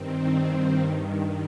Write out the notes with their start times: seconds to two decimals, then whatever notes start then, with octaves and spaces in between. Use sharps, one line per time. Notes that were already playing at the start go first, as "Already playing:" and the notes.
Already playing: G2 D#3 C4